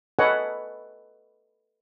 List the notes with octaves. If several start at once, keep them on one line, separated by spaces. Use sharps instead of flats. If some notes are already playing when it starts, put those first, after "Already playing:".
A4 B4 C#5 D#5 F#5 G#5